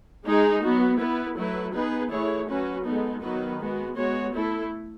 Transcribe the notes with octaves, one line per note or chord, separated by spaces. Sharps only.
G#3 D#4 G#4
F#3 B3 F#4
B3 E4 B4
F#3 A3 E4 B4
B3 D#4 G#4 B4
E3 A3 E4 G#4 C#5
F#3 C#4 F#4 B4
G#3 B3 D#4 A4
D#3 F#3 B3 F#4 B4
G#3 B3 F#4
G#3 B3 F#4 C#5
A3 E4 A4